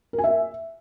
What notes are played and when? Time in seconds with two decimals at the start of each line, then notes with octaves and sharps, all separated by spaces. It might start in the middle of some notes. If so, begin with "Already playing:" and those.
0.13 A#4
0.18 G#5
0.24 E5